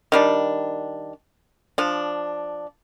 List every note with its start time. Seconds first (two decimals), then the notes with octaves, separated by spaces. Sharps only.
0.12 D#3 G3 D4
1.78 F3 D4